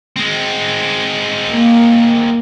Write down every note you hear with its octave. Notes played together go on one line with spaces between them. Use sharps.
G#3 C4
A#3